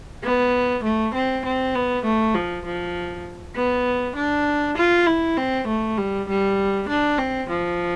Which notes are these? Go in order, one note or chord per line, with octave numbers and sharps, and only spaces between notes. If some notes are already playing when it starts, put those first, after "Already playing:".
B3
A3
C4
C4
B3
A3
F3
F3
B3
D4
F4
E4
C4
A3
G3
G3
D4
C4
F3